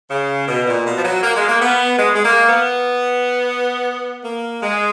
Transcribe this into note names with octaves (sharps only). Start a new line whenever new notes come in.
C#3
B2
A#2
B2
F3
F#3
A#3
G#3
A#3
B3
G#3
G#3
A#3
B3
A#3
G#3